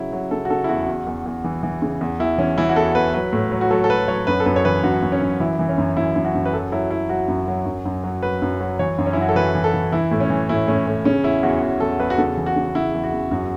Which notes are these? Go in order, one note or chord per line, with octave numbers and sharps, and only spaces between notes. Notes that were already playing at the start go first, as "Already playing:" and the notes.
Already playing: C#3 F#3 E4
F#3
C#3 A4
F#4
C#3 A4
E4
E2 F#4
E2
E2
E2
E3
E3
C#3
E2
E2 E4
E3 C#4
E3 E4
F#4
E2 A4
E2 B4
F#3 B4
A2
F#3
F#4
F#3 A4
A4
F#3 B4
F#3 C#5
F#2 B4
A4
F#2 B4
C#5
E3 B4
F#2 F#4
F#2
C#4
F#2
E3 E4
E3
C#4
F#2
F#2 E4
F#2
F#4
F#2
B4
F#3 A4
F#3 E4
F#3 E4
F#3 F#4
F#2
F#3
F#2
F#2
F#3
F#3 B4
F#2
F#3
E3 C#5
F#2
C#4
E4
F#2 F#4
A4
E3 B4
E3
A4
E3
E3 E4
A2
C#4
E3
A2 E4
A2 C#4
A2
C#3 C#4
E2 E4
E2 F#4
E2 F#4
E2 A4
E2 B4
F#4
C#3 A4
E3
F#4
C#3
C#3 E4
E2
F#4
E2
F#2 F#4